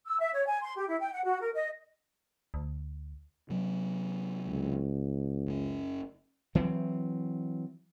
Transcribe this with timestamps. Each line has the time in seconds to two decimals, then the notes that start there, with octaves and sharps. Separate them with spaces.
0.06 E6
0.20 E5
0.33 C#5
0.47 G#5
0.62 C6
0.77 G4
0.88 E4
1.00 G5
1.12 F#5
1.25 F#4
1.41 A#4
1.55 D#5
2.54 D2
3.50 C3 F#3
4.48 C#2
5.46 F#1 C#4
6.55 E3 F#3 C4